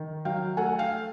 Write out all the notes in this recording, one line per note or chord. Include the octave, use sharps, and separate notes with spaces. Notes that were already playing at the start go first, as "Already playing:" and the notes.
Already playing: D#3
F#3 F5 G5
A3 F#5 G#5
F5 G5